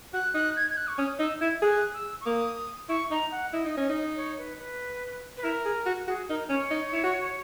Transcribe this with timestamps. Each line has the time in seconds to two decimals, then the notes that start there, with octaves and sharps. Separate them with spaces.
0.14 F#4 F#6
0.35 D#4 F#6
0.56 G#6
0.70 G#6
0.77 F#6
0.88 C#6
0.98 C#4 D#6
1.19 D#4 E6
1.41 E4 G#6
1.62 G#4 F#6
1.93 E6
2.21 C#6
2.26 A#3 D#6
2.89 E4 C#6
3.11 D#4 A#5
3.32 F#5
3.53 E4 D#5
3.65 D#4
3.77 C#4
3.89 D#4
4.16 C#5
4.38 B4
4.59 B4
5.37 B4
5.43 E4 A#4
5.65 G#4
5.86 F#4
6.08 F#4 G#4
6.29 D#4 A#4
6.50 C#4 C#5
6.71 D#4
6.93 E4
7.04 F#4